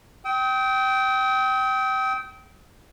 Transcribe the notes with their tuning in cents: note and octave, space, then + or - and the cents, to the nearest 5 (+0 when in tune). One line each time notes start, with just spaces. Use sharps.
G5 -20 D#6 +40